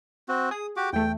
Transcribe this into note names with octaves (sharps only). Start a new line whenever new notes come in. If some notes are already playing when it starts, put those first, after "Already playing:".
C4 F#4
G#4 D#6
F#4 G4 D6
E2 A3 G5